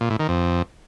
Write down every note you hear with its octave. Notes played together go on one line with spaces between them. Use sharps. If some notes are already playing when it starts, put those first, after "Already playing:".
A#2
A2
D#3
F2